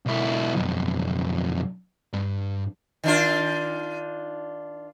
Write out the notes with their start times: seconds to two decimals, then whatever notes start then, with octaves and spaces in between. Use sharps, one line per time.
0.06 B1 E4
0.56 B1 F2
2.13 G2
3.04 D#3 D4 F4